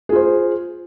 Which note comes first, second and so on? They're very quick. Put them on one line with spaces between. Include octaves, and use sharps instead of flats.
G#4 F4 C5